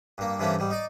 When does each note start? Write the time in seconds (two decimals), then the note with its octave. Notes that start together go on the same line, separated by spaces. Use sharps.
0.18 G2 A#3
0.39 G2 C3 E3 A3 A#3 C#4
0.59 G#2 G3
0.70 D#4 D5